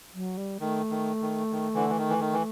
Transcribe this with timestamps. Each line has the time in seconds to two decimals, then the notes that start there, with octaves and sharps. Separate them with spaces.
0.14 F#3
0.37 G3
0.60 D#3 A3
0.91 D#3
1.22 D#3
1.52 D#3
1.74 D3 E3
1.90 E3
1.98 D#3
2.09 E3
2.20 D#3
2.33 E3